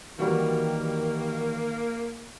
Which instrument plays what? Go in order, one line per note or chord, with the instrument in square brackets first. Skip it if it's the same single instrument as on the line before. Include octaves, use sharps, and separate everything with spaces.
[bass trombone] D#3 [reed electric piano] E3 B4 [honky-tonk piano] G3 F#4 [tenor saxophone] A#3